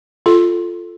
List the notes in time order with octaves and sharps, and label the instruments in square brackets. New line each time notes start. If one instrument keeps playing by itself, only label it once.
[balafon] F4 A4